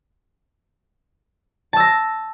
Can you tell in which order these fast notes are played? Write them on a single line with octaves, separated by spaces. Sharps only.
A5 E6 A#6